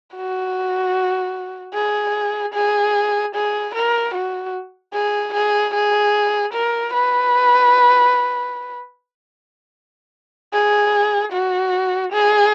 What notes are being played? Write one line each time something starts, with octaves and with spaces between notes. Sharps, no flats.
F#4
G#4
G#4
G#4
A#4
F#4
G#4
G#4
G#4
A#4
B4
G#4
F#4
G#4